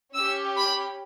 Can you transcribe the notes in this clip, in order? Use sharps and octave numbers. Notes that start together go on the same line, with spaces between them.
C#4 G4 E6
B5